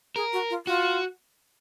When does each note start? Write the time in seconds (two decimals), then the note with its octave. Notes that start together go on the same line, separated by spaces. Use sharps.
0.16 G#4 A#4
0.33 F#4
0.50 F4
0.66 F4 F#4